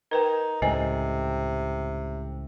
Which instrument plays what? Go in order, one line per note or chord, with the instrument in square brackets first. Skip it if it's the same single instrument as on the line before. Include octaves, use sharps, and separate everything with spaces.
[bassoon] D#4 [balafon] A#4 B4 G5
[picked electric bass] C#2 A2 [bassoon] C3 [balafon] C5 D#5 G#5